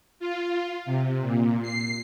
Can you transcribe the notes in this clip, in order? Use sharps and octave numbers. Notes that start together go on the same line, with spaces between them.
F4
C3
A#2
C7